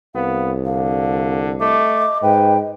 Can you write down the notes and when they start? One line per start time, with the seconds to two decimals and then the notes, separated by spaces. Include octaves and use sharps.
0.15 C2 B3 F5
0.65 D3 F5
1.60 A3 D#5 D6
2.23 G#2 B4 G5